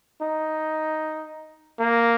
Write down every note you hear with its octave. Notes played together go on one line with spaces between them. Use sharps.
D#4
A#3